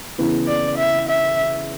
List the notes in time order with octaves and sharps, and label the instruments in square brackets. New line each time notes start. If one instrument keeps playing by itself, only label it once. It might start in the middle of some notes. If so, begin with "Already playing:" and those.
[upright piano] C#3 E3 B3 E4
[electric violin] D5
E5
E5